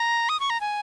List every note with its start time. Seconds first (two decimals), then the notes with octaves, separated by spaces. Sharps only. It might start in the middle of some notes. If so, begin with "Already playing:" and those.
Already playing: A#5
0.29 D#6
0.40 C#6
0.50 A#5
0.61 G#5